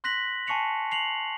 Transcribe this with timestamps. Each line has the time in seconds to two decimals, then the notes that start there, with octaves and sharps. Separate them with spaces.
0.04 C6 F#6 A#6 B6 F#7
0.47 G#5 A5 C#6 C7 C#7 F7
0.92 C7 F7 F#7